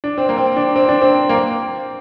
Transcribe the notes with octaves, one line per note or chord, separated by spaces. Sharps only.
D4
C4
A#3
C4
D4
C4
D4
C4
A#3
C4